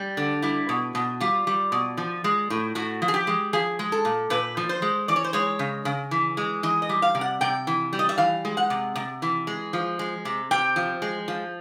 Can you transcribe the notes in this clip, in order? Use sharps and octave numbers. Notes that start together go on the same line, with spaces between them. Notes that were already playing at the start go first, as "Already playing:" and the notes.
Already playing: G3
D3
G3 E4
B2
B2
G3 F4
G3
B2
F3
G#3
A2
A2 F#4
F3
G#4
G4
G#3
F3 G#4
G#3
A4
A#2
A#2 B4
F3
C5
G#3
E3 D5
C#5
C5
G#3 C#5
C#3
C#3
E3
G#3
E3 D#5
D#5
G3
F5
C3
F#5
C3 G5
E3
G3
D#5
E5
E3 F5
G#3
F#5
C3
C3
E3
G#3
F3
G#3
C3
C3 G5
F3
G#3
F3